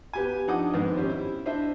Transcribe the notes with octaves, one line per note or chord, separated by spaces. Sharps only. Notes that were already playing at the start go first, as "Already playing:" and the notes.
B3 G4 G#5
F3 D4 D#4 F#5 D6 D#6
F2 G#2 D#3 B3
C#4 G4 C5
E4
D4 C5 D#5 E5